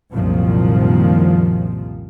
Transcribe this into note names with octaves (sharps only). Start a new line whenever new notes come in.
C2 F#2 A#2 D#3 F3